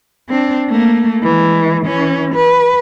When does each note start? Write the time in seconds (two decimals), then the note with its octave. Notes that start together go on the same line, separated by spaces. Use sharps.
0.29 C4 D4
0.69 A3 A#3
1.23 E3 G#3
1.83 E3 C#4
2.35 B4